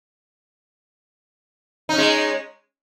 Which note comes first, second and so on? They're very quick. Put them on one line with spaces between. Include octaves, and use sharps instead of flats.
D#4 C#4 G#3